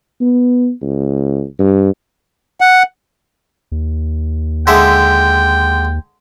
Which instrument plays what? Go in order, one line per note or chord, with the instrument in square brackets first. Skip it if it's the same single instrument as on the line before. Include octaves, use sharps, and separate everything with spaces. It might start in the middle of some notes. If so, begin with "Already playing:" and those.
[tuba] B3
C#2
G2
[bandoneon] F#5
[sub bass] D#2
[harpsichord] D3 G#3 E5 [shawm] G5